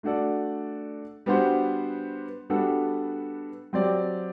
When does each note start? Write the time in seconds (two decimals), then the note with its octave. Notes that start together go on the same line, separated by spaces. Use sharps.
0.03 A3 D4 F#4 A4 D5
1.26 G3 B3 D4 F#4 C5
2.50 G3 B3 D4 F#4 A4
3.73 F#3 C4 G4 D5